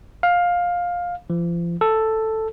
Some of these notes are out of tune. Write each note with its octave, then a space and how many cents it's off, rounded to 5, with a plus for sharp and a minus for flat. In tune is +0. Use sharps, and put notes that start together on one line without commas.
F5 +15
F3 -35
A4 +5